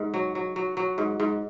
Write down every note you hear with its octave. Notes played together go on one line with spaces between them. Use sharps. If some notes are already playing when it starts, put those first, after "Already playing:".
Already playing: G#2
F#3
F#3
F#3
F#3
G#2
G#2